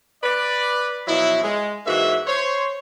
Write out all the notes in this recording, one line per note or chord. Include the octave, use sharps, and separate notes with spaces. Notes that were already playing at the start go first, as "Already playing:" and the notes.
B4 D5
B2 F3 F#3 E4
G#3
G#2 E3 A#3 F#4 E5
C5 C#5